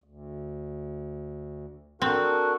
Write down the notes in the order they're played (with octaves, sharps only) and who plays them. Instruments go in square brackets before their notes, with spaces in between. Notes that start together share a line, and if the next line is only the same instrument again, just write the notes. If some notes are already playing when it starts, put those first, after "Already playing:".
[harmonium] D2
[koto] C4 [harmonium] D4 A4 A#4 [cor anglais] F#4